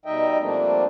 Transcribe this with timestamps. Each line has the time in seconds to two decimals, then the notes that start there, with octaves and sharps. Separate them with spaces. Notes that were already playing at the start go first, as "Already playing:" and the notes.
0.05 B2 G3 D#4 D#5 E5 G5
0.40 F3 G3 A3 A#3 C4 D4